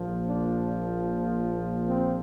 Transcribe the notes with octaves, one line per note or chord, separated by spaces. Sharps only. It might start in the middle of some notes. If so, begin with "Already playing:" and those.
Already playing: A#1 A#2 F3
D4
C4